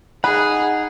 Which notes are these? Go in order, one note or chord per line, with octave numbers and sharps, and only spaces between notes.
D#4 G#4 F#5 B5